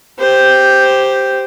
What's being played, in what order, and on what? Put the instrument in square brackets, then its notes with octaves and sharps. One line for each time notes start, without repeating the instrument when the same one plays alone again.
[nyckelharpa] G4 C5